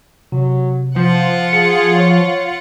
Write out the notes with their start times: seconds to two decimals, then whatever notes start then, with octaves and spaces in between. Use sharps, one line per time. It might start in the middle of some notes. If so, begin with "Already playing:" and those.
0.32 C3 F#3
0.96 F3 F4 C5 F#5
1.53 G#4 C#7
1.96 C#5